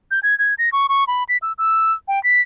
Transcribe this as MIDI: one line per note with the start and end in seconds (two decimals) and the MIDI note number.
0.11 0.20 91
0.23 0.37 92
0.39 0.54 92
0.59 0.70 94
0.72 0.87 85
0.89 1.04 85
1.07 1.24 83
1.29 1.37 95
1.42 1.53 88
1.58 1.93 88
2.08 2.22 79
2.24 2.41 95